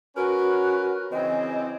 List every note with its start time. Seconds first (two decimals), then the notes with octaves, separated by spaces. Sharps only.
0.16 C#4 F#4 A#4 B4
1.12 C#3 E3 C4 D#5